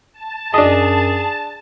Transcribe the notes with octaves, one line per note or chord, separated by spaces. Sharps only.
A5
F#2 D4 G#4 D#5